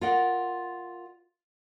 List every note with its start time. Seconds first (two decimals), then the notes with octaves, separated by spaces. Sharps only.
0.01 F4 A#4 D5 D#5 F#5